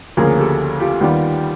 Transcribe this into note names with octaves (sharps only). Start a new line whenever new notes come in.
D2 C#3 F3 A#3 C#4 G#4 A#4
G4 A4
F4 G4
D#2 D#3 G3 B3 F4 G4